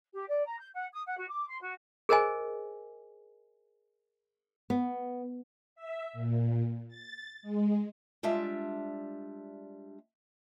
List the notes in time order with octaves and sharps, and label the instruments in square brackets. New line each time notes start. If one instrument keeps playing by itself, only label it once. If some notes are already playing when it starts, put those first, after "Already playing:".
[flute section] G4
D5
A#5
G6
F#5
D#6
F#5
F#4
D6
C6
F#4
[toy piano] G#4 A#4 C5 D#5 G#5
[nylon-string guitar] B3
[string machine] E5
A#2
A6
G#3
[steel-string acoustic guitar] G3 G#3 D4 F4 E5